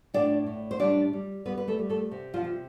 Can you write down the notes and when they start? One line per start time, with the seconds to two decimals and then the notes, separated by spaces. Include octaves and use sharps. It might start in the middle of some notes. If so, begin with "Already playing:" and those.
0.14 A2 D4 D5
0.47 A2
0.71 C5
0.80 G3 D4 D5
1.13 G3
1.45 G3 B3 B4
1.58 B4
1.68 A3 A4
1.79 G3
1.89 A3 A4
2.11 C3
2.34 F3 F4
2.44 C3